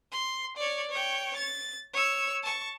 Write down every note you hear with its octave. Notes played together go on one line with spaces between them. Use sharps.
C6
C#5 D5
C#5 G5
A6
C#5 E6
A5 C#6